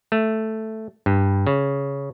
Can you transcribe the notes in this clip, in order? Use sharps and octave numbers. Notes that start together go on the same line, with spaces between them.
A3
G2
C#3